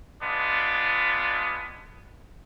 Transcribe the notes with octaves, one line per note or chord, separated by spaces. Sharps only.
G#3 B3 D4 F4